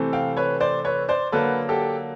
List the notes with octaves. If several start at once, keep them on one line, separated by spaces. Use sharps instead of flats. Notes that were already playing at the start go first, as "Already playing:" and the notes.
Already playing: C3 E3 A3 C4
F5 G5
B4 C#5
C5 D5
B4 C#5
C5 D5
D3 F#3 A#3 A4 B4
G4 A4